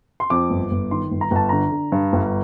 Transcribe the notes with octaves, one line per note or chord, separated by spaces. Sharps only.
C6
F2 D6
G1
G1
D#3 C6
G1
A#5
G1 A5
D3 A#5
D3
G2
G1